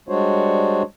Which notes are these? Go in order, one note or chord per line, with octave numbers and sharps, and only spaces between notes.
G3 G#3 D4 F#4 C5 C#5